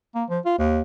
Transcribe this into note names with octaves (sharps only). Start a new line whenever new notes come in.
A#3
F3
F4
D#2